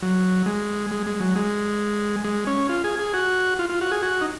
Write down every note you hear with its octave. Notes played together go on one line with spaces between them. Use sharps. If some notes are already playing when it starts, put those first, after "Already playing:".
F#3
G#3
G#3
G#3
F#3
G#3
G#3
C#4
F4
G#4
G#4
F#4
F4
F4
F#4
G#4
F#4
D#4